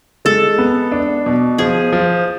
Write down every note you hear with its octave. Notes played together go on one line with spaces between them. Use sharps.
G#3 A4
B3
D4
B2
F3 G#4
F3